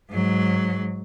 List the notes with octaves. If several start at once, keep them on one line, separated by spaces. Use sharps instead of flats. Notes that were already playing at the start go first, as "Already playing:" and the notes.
G#2 F#3